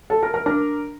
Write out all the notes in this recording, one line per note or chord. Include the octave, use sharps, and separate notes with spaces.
A4 A5
A#4 A#5
A#4 A#5
D4 A#4 A#5